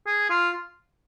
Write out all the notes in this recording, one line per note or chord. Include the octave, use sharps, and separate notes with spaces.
G#4
F4